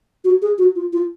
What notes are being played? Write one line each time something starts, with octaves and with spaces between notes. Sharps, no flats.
F#4
G#4
F#4
F4
F4